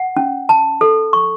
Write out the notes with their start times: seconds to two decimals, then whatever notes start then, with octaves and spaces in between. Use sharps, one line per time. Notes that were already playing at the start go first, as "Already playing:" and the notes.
Already playing: F#5
0.17 C#4
0.49 A5
0.81 A4
1.13 C#6